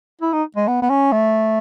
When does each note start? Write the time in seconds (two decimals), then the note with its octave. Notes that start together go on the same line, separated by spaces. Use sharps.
0.21 E4
0.33 D#4
0.56 G#3
0.68 B3
0.82 B3
0.90 C#4
1.12 A3